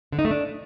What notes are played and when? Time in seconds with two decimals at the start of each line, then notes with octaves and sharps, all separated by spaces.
0.12 D3
0.19 D#4
0.25 A3
0.31 D4